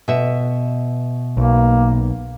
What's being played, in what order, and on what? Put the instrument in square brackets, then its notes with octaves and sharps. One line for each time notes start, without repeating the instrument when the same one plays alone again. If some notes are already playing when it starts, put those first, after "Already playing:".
[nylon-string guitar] B2 E5
[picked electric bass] B1 [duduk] A#3